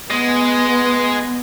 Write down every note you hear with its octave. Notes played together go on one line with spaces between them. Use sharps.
G#3 B3